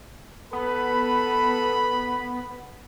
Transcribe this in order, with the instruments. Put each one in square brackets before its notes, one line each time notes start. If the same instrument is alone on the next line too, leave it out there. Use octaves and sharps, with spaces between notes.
[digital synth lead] B3 [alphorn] A4 [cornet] B4 [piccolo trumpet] B5